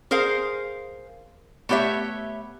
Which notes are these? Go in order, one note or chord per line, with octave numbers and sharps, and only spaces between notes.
G#4 A#4 C5 F5
A3 B3 G4 C#5 E5